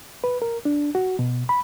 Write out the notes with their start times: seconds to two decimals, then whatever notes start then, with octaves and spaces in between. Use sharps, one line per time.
0.24 B4
0.42 A#4
0.65 D4
0.95 F#4
1.19 B2
1.49 B5